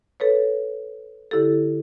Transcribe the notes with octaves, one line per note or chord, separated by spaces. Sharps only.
A4 B4 C#5
D3 E4 G4 A4